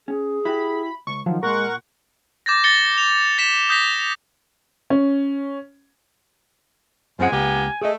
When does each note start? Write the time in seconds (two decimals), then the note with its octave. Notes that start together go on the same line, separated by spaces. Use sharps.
0.08 C#4 G#4
0.45 E4 F#4 G4 B5
1.07 C#2 C#6
1.26 D#3 F3 F#3
1.43 A#2 G#3 A#4 F#5 C6 C#6
2.46 D6 G6 A6 A#6
2.64 A6 A#6 C#7 G7
2.98 F7
3.38 A6 B6 E7
3.69 D#6 G6 A#6 B6
4.90 C#4
7.19 F#2 C#3 F3 G#3 C4 F#5 G#5
7.32 C#2 A#3 B3 G4
7.82 A3 G#4 D#5